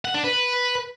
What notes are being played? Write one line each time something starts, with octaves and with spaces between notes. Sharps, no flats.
F#5
D4
B4